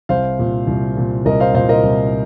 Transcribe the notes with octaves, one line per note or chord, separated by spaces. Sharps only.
C2 C5 F5
A#2
C2
A#2
C2 A#4 D#5
C5 F5
A#2 C5 F5
A#4 D#5
C2